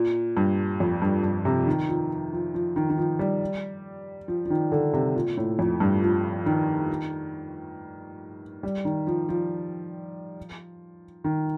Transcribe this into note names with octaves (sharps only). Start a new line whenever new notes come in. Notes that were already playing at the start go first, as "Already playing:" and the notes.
Already playing: A#2
G2
F2
G2
G2
C3
D#3
F3
F3
F3
D#3
D#3
F3
G3
F3
F3
D#3
D3
C3
A#2
A2
F2
G2
F3
D#3
G3
D#3
F3
F3
D#3